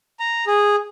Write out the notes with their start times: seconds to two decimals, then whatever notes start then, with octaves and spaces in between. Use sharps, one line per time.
0.20 A#5
0.47 G#4